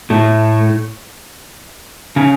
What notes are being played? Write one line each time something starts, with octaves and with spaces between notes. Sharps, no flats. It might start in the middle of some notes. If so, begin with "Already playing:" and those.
A2 A3
C#3 C#4